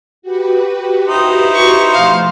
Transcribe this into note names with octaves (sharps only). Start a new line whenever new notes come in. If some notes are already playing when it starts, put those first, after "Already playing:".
F#4 G4 B4
D#4 E4 C5
C#6
B2 F3 A3 F5